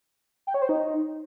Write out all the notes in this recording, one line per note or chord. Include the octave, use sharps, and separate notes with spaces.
G5
C#5
C5
D#4